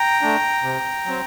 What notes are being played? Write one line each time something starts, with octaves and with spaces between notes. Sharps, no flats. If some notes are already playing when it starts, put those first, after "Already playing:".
Already playing: G5 A#5
A3 D4
C3
F#3 C4